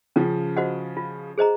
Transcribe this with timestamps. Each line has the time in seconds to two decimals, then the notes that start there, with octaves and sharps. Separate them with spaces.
0.16 C#3 F3 C#4
0.57 F#4 C5 D#5 F#5
0.97 F4
1.38 G#4 C5 D#5 A#5